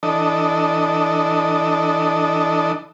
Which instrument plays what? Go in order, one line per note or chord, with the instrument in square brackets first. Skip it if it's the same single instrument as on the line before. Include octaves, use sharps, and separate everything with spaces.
[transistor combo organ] E3 D4 A4 D#5